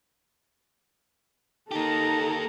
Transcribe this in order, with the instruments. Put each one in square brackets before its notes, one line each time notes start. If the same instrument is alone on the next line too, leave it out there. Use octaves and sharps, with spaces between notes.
[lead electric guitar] A#3 G4 [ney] D#4 [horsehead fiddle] A4 A#5